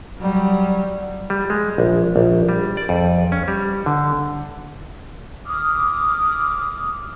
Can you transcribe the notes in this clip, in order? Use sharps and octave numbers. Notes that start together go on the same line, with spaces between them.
F#3 G3
G3
G#3
A#1
A#1
G3
D5
F2
C#4
G3
D3
D6 D#6 F6